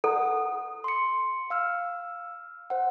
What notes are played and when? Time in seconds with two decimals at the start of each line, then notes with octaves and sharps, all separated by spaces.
0.04 A4 F#5 D#6
0.84 C6 C#7
1.50 F5 E6 F6
2.70 C5 F#5